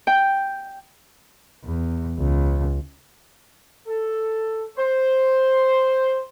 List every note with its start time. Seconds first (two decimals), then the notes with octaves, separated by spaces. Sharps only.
0.07 G5
1.64 E2
2.17 C#2
3.87 A4
4.78 C5